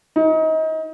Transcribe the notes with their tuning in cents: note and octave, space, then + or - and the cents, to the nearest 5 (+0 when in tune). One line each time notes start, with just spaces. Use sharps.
D#4 +30